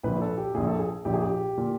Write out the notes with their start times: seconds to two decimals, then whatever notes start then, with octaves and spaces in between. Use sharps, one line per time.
0.03 A#1 A#2 B4
0.21 A4
0.38 G4
0.54 A#1 A#2 G#4
0.67 A4
0.79 G#4
1.05 A#1 A#2 G4
1.14 G#4
1.21 G4
1.57 A#2